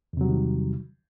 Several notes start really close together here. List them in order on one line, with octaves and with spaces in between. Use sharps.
E2 C3 F#3 G3 D#3